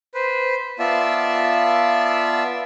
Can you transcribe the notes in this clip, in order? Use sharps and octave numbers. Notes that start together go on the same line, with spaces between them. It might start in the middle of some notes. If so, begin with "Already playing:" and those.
B4 C5
B3 F4 D5 E5 A5